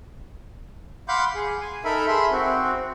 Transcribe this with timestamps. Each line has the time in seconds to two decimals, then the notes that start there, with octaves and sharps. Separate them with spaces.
1.08 F5 F#5 B5 C6 D6 G6
1.35 G#4
1.61 G#5
1.84 D#4 A4 A#4 E5 B5
2.07 G#4 E5 B5 C6
2.31 C4 F#4